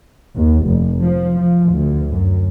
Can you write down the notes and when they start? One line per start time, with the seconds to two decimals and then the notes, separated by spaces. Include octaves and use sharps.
0.36 D#2
0.65 F1
1.02 F3
1.37 F3
1.72 D2
2.10 F#2